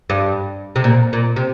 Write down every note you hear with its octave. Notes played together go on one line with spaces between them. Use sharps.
G2
C3
A#2
A#2
C3